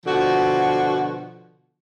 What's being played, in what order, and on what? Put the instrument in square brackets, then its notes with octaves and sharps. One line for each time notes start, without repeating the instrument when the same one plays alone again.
[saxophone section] B2 D3 F3 F#4